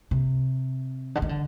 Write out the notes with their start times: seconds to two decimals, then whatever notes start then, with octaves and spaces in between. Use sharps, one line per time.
0.11 C3
1.15 D3
1.22 D#3
1.29 D3